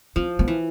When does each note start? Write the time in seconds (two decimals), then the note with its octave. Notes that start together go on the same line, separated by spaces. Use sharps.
0.16 F3 C4
0.39 B3
0.48 E3